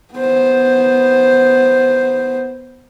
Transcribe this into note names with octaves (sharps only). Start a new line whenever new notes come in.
B3 C5